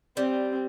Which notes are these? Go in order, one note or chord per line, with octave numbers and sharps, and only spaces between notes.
G3 C4